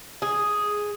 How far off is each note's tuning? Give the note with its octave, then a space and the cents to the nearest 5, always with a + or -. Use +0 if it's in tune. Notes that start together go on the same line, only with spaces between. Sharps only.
G#4 +0